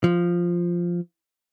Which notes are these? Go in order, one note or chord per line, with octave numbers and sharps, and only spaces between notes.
F3